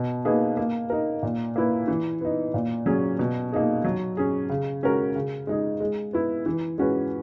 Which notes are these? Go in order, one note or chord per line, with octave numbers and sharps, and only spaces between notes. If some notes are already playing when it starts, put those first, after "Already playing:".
Already playing: B2
A#3 D#4 G#4 B4
A#3
D#4 A#4
A#2
A#3 E4 B4
E3
B3 D#4
A#2
F#3 C#4 G#4
B2
A#3 D#4 G#4
F#3
C#4 G#4
C#3
G#3 C#4 F#4 A#4
C#3
G#3 D#4 G#4
G#3
B3 E4
E3
G#3 C#4 F#4 B4